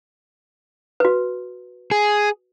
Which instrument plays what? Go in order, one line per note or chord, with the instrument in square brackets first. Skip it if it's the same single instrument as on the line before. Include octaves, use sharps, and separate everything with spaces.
[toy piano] F#4 B4
[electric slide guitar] G#4